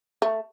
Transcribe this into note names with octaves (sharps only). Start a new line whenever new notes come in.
A3